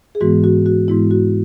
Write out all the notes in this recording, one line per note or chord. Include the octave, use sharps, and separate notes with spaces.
G#4
G#2 E3 G#3 B3 F#4
F#4
F#4
G#2 E3 G#3 B3 E4
F#4